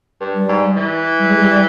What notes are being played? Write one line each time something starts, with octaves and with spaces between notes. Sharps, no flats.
G2
G3
G#2
E3
G3
G#3
G3